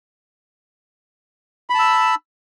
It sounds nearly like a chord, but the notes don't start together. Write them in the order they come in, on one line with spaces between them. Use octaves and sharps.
B5 A5 E6